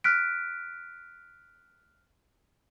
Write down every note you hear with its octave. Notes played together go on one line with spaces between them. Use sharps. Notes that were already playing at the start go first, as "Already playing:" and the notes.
F6 F#6 B6 D7